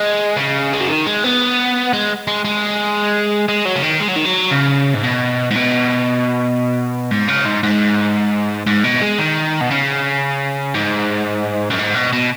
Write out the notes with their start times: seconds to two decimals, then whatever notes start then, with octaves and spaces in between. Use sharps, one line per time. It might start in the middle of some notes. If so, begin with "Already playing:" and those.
Already playing: G#3
0.37 C#3
0.73 G#3
0.80 F#3
0.89 D#3
1.06 G#3
1.24 B3
1.93 G#3
2.27 G#3
2.45 G#3
3.49 G#3
3.65 F#3
3.76 C#3
3.83 D#3
4.00 G#3
4.08 F#3
4.16 D#3
4.25 F#3
4.51 C#3
4.95 G#2
5.04 B2
5.51 G#2
5.56 B2
7.11 G#2
7.28 C#3
7.45 G#2
7.63 G#2
8.67 G#2
8.84 B2
9.02 G#3
9.18 D#3
9.61 B2
9.71 C#3
10.74 G#2
11.70 F#2
11.78 G#2
11.95 B2
12.13 B2